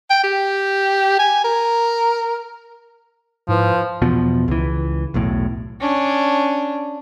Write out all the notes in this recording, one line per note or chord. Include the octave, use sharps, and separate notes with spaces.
G5
G4
G#5
A#4
G#2 F3 E4 B4
E2 B2 F3
C#2 E3
B1 E2 A2
C#4 D4